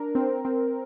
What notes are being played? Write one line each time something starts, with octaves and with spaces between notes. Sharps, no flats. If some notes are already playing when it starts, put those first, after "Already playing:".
Already playing: D4 A#4
C4
C4